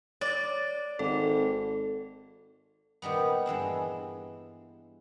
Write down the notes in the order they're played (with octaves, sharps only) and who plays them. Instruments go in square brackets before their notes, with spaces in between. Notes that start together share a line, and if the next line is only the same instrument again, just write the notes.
[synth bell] C#5 D6 A6 [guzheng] D5
[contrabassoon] G#1 [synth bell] A4
[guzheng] A#2 D#3 G3 B3
G2 E3 G#3 E4